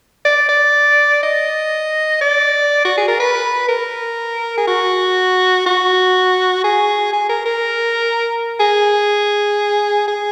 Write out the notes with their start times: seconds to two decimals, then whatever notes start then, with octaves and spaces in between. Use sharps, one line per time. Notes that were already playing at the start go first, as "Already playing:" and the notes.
0.25 D5
0.49 D5
1.23 D#5
2.21 D5
2.85 F#4
2.98 G#4
3.08 A#4
3.20 B4
3.69 A#4
4.57 G#4
4.68 F#4
5.66 F#4
6.64 G#4
7.13 G#4
7.29 A#4
7.46 A#4
8.60 G#4
10.08 G#4